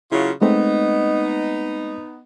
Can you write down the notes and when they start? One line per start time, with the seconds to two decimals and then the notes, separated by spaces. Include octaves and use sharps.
0.12 C#3 F#3 E4 F4
0.42 G#3 A3 B3 C4 D#4